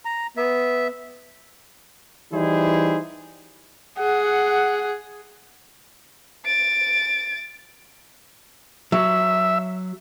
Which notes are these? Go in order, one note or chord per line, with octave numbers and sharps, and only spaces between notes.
A#5
B3 E5
E3 G3 D#4 E4 G#4 C5
G#4 F#5
A6 D7
F#3 E5